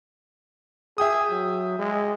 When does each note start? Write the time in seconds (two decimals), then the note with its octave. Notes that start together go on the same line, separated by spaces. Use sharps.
0.98 G#4 E5 G5 D#6
1.30 F#3
1.79 G#3